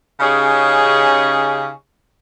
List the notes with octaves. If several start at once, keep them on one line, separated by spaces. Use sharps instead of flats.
C#3 C#4 D#4 G4 G#4